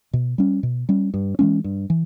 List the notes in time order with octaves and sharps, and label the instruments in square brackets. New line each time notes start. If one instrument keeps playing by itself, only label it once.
[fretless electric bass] B2
G3 C#4
B2
G3 C#4
G2
E3 G#3 C#4
G2
E3